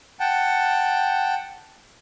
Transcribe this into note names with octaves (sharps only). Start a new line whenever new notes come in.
F#5 G5 A5